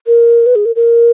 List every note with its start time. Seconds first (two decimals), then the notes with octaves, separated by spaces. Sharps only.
0.07 A#4
0.46 B4
0.55 G#4
0.65 A#4
0.76 A#4